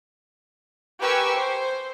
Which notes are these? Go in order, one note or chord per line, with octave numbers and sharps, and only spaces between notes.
G4 A#4 B4 G#5 C#6 E6
C5